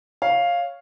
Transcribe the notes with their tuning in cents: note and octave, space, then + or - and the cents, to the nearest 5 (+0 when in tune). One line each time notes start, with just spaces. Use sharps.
C#5 +0 F5 +0